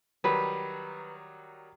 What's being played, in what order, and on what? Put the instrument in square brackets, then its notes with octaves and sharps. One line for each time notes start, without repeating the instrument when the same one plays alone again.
[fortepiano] D#3 F#3 G3 [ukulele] B4